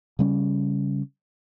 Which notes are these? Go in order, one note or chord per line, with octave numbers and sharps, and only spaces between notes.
C#3 G3 C#4